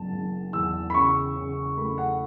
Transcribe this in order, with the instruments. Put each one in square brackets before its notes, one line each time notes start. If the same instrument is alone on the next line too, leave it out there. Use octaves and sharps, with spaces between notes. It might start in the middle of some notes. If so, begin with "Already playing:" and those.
Already playing: [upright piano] F#1 B3 A5
F#1
E2 E6
B5
C#3 C#6
C#3
A3 B5
F#5